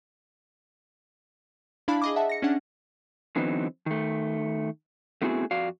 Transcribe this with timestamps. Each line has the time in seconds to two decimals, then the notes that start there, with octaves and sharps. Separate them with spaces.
1.88 D4 E4 F5 A5 B5
2.02 G#4 D#5 D6
2.16 E5 F#5 A5
2.29 A#6 C#7
2.42 C#4 D4 F#5
3.36 D3 E3 F#3 B3 C4 D#4
3.86 D#3 A3
5.22 A3 B3 C4 E4 F#4 G#4
5.51 F2 F#4 D5 F5